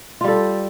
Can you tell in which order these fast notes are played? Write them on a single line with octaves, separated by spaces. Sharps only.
F4 G3 A4